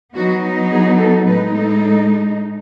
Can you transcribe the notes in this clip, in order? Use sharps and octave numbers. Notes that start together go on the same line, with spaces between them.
F#3 B3 D#4 F#4
G#4
A4
A2 G#3 D#4 B4
A4